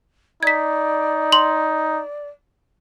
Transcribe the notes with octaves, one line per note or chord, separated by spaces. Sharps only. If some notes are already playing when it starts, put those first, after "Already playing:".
D#4 D5 G#6 B6
C6 F#7